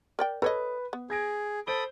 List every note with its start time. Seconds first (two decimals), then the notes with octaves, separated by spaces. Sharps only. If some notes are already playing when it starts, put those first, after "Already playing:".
0.19 A#4 D5 G5
0.42 A4 B4 C#5 D#5
0.93 B3
1.10 G#4 G#6 A#6 D7
1.67 A4 C5 B5 D#6 D7 G7